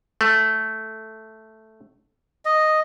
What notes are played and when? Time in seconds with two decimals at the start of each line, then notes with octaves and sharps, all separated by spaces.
0.21 A3
2.45 D#5